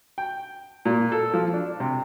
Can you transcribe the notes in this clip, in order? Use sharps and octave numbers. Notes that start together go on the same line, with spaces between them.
G5
A#2
A4
F3
D4
C3